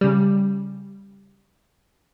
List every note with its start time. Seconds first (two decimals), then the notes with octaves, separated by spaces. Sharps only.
0.01 C#3 G3